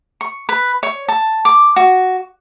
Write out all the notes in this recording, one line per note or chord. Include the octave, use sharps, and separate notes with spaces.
C#6
B4
C#5
A5
D6
F#4